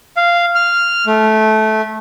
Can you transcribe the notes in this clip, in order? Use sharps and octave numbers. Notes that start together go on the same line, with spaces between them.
F5
F6
A3